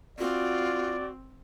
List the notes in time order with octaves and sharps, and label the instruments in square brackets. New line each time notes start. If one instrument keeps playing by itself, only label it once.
[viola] C4 [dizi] F4 [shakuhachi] F#4 [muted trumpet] D5